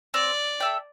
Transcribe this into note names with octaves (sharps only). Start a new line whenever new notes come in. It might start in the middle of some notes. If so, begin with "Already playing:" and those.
C4 D5
A4 E5 G5